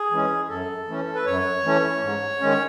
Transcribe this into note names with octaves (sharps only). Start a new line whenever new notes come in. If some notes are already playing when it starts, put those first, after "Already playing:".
Already playing: G#4
E3 G#3 C#4
F#2 A4
E3 A3 C#4
B4
F#2 C#5
E3 A3 C#4
G#2
D#3 G#3 C#4